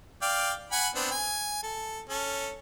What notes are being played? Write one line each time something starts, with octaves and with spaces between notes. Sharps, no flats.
D5 F5 G5
F#5 G#5 B5
B3 C4 D4
G#5
A4
C#4 A4